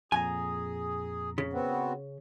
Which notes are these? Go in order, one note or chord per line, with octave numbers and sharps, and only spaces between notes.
F2 A#2 G#4 G#5 A#5
C#3
B3 C4 F#4